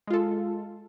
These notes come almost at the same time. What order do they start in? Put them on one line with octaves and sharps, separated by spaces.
G#3 F4 A4